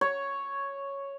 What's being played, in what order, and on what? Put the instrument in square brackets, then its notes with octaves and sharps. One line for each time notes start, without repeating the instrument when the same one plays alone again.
[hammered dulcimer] C#5